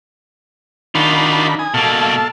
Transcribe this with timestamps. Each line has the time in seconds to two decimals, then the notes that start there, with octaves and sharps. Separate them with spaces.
0.95 D#3 D4 F4 F#4 B5
1.59 G#5 D#6
1.74 B2 A#3 A4 F5 A5